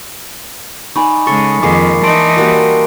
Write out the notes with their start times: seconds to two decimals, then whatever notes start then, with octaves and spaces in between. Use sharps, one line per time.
0.96 D#4 D5 G#5 B5 C#6
1.27 C#3 G#3 A4 C#6 A6 C#7
1.63 F2 D#3 G#3 A#3 D6 C7
2.03 E3 D#4 D5 A5 C6 D7
2.37 G3 A#3 F#4